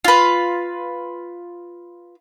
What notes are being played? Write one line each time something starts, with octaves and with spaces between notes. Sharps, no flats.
F4 B4